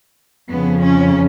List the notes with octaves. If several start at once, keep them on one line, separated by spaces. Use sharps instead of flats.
F2 C#3 F3 B3
C#4